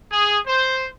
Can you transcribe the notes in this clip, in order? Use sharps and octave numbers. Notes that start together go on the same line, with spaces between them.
G#4
C5